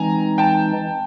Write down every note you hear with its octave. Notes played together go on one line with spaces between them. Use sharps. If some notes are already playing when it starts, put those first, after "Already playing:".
Already playing: E3 G#3 C4 D#4 G#5 A#5
G5 A5